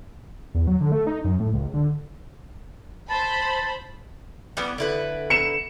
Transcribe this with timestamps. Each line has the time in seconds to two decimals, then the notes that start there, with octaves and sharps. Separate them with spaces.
0.54 E2
0.67 F#3
0.81 D3
0.92 A3
1.07 D#4
1.24 F#2
1.40 A2
1.54 C#2
1.74 D3
3.08 C5 A5 B5
4.57 E3 G3 B3
4.78 D3 E4 B4
5.30 C#7 E7